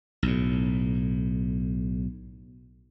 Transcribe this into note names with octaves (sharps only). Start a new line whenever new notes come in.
B1 A2